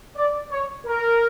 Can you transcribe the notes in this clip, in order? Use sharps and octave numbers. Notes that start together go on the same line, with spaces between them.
D5
C#5
A#4